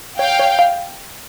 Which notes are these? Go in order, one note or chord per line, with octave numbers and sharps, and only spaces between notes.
C#5 F5 G5
C#5
F5